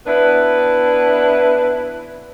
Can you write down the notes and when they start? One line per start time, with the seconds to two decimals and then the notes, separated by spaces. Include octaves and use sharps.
0.07 B3 D4 E4 B4